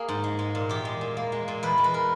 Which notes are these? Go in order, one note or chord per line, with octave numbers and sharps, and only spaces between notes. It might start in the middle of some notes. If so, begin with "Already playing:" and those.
Already playing: A#3 G#4
G#2
G#3
G#3
A#2
E2 G4
G#3
A#2
A#3
G#3
A#2
E2 B4
G#3
B4
A#4